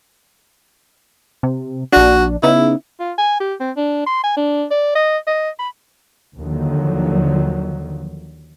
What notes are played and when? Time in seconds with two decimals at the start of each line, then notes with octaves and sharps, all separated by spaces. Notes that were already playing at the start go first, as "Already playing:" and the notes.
1.43 C3
1.93 A#1 D4 F#4
2.43 C#3 B3 D#4 E4
2.99 F4
3.18 G#5
3.40 G4
3.60 C4
3.76 D4
4.06 C6
4.24 G#5
4.37 D4
4.71 D5
4.95 D#5
5.27 D#5
5.59 B5
6.38 D#2 D3 D#3 F3 F#3